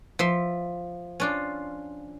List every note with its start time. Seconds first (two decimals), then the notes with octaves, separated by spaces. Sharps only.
0.19 F3 E5 C6
1.20 C#4 D4 F4